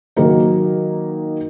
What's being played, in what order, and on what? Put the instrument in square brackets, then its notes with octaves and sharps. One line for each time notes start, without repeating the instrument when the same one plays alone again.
[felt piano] D#3 F#3 A#3 D#4 A#4